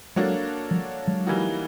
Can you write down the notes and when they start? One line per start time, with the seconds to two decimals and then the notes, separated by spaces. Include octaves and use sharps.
0.16 F#3 G#3 A#3 D4 F#4 A4 C#5
0.71 F3 G3
1.07 F#3 G#3
1.27 E3 G3 A#3 D#4 F#4